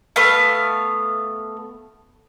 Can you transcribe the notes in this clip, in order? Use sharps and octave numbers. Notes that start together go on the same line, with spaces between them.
A3 B3 F5